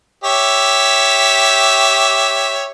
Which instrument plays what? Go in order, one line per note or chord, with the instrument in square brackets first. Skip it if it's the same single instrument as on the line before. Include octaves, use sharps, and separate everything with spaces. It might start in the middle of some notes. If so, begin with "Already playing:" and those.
[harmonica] G4 C#5 E5